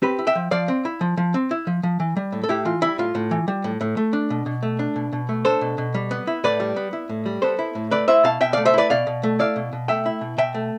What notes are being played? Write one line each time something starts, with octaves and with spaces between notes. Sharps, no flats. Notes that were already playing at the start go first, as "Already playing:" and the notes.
C4 G4 B4
E4
E5 G5
F3
F3 D5 F5
C4
E4
F3
F3
C4
E4
F3
F3
E3
G3
A2
A4
A2 E4 G4
E3 F4
G3 E4
A2 F4
A2
E3
G3
A2
A2
A3
D4
B2
B2
A3
D4
B2
B2
A3
D4 A4 C5
B2
B2
G3
B3
E4
A2 B4 D5
G3
B3
E4
A2
G3
B3 A4 C5
E4
A2
A3 B4 D5
E4 C5 E5
B2 F5 A5
B2 E5 G5
A3 D5 F5
C5 E5
E4 B4 D5
B2 D5 F5
B2
A3
E4 D5 F5
B2
B2
A3 E5 G5
E4
B2
B2 E5 G5
A3